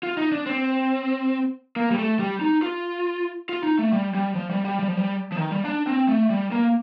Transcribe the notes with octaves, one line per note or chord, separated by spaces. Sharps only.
F4
D#4
D4
C4
A#3
G3
A3
G3
D#4
F4
F4
D#4
A3
G3
G3
F3
G3
G3
G3
F3
G3
F3
D#3
G3
D4
C4
A3
G3
A#3